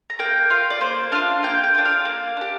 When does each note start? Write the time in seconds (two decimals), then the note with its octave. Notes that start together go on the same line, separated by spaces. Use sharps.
0.10 A#5
0.19 A#3 G5
0.50 F4 F5
0.70 D5
0.81 A#3 C5
1.12 D4 F4 F5
1.43 A#3 G5
1.64 G5
1.74 D4 F4
1.85 F5
2.05 A#3
2.37 D4 G4